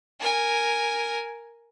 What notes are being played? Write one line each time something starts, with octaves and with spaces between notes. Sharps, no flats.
A#4 G#5